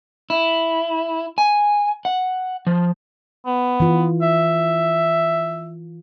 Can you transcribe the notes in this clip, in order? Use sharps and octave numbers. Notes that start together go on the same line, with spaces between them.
E4
G#5
F#5
F3
B3
E3 F4
E5